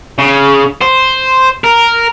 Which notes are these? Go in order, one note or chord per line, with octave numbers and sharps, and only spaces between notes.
C#3
C5
A#4